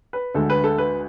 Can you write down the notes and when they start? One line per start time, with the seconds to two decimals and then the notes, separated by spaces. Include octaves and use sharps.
0.13 B4
0.34 D2 D3 G#3 A4
0.50 B4
0.64 A4
0.78 B4